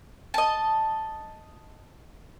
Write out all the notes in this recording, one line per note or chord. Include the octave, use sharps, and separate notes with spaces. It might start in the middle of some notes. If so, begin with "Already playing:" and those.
D#5 A5